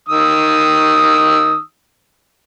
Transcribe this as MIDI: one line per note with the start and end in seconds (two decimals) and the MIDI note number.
0.09 1.60 51
0.09 1.60 87
0.09 1.60 88